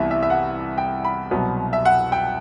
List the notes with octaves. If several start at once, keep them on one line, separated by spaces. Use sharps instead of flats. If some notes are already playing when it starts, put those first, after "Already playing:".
Already playing: C2 C3 E3 B3 E4 E5
E5
E5
F#5
G5
B5
C2 B2 F#3 B3
E5
F#5
G5